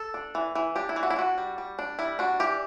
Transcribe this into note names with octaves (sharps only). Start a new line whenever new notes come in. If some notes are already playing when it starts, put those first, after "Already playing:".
Already playing: A4
D4
E3
E3
D4 G4
E4
E3
F#4
E4
D4 F#4
G3
G3
D4
G3 E4
D4 F#4
E3 G4